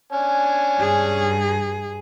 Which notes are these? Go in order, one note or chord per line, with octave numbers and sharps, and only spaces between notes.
C#4 D4 G#5
G2 G#4